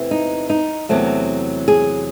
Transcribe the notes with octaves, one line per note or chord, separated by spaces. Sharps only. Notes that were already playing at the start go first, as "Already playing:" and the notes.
Already playing: E2 C3 E3 A3
D#4
D#4
E2 C3 F#3 A3
G#4